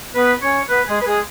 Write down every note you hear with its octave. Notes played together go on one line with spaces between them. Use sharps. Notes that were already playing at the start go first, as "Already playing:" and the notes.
B3 B4
C#4 C#5
B3 B4
G#3 G#4
B4
G#3 G#4